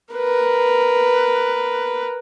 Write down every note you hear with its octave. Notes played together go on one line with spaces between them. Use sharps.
A#4 B4